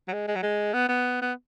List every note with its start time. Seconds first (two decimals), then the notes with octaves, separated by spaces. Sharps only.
0.08 F#3
0.13 G#3
0.28 G#3
0.36 F#3
0.43 G#3
0.74 B3
0.89 B3
1.22 B3